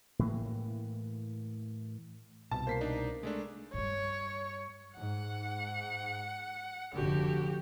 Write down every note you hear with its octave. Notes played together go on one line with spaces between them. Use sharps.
A2 E3 A#3
C2 B2 A5
A#3 C5 B6 C7
D4 D#4
G#3 A3 D4
G2 G3 C#5
G#2 F#5
F1 D3 F#4 G4